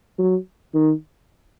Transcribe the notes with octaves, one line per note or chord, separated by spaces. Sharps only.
F#3
D#3